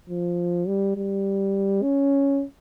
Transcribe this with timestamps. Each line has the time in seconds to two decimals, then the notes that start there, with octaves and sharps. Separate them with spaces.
0.09 F3
0.68 G3
0.96 G3
1.83 C#4